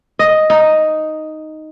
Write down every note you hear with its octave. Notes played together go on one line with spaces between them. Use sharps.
D#5
D#4